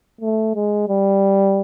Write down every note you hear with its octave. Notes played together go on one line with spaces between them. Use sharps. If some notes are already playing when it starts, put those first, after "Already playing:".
A3
G#3
G3